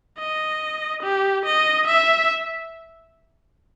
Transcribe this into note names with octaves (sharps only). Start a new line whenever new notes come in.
D#5
G4
D#5
E5